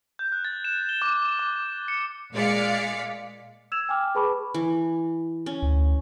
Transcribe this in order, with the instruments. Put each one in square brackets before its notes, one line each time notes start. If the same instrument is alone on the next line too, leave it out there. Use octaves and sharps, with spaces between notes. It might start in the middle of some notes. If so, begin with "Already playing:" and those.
[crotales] G6
F#6
A6
E7
G7
D6
D6
C#7
[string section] A#2 G#3 D5 F5 B6 C#7
[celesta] E6 G#6 E7 F7
G5 G#5 D6 F6
G#4 B4 A5 B5 C#6 D6
[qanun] E3
C#4
[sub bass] D2